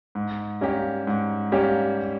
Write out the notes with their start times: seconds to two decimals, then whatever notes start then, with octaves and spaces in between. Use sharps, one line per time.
0.15 G#2
0.61 G3 A#3 C#4 G4
1.07 G#2
1.52 G3 A#3 C#4 G4